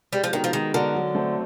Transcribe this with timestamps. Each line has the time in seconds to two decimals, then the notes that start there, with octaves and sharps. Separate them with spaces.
0.13 G3 G#3
0.24 F3
0.33 D#3 B3 D#4 F#4 A#4
0.44 F3
0.53 D#3 G#3
0.74 D3 B3 D#4 F#4 A#4
0.95 F#3
1.15 A3 C4